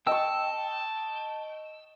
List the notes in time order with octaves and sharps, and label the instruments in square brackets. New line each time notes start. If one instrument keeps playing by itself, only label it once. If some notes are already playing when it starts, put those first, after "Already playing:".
[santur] D#5 C#6 [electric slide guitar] G5 [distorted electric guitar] A5 [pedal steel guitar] E6